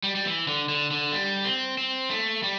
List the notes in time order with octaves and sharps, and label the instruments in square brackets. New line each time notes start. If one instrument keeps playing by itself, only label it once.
[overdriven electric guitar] G3
G3
E3
D3
D3
D3
G3
C4
C4
A3
G3